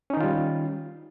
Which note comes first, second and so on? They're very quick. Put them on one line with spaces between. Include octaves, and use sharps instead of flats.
C#4 D#4 D#3 F4 G3